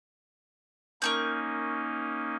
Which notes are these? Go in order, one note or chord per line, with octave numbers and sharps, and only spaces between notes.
A#3 C#4 D#4 A#4 C#6 G6